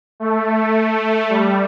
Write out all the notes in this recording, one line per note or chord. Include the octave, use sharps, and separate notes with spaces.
A3
G3